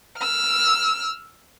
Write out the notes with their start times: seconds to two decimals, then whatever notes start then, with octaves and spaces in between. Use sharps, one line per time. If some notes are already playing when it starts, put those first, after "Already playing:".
0.18 E6 F6